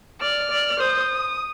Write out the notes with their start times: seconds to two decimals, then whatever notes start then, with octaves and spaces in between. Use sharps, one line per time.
0.21 D5 F6
0.50 D5
0.79 C5 D#6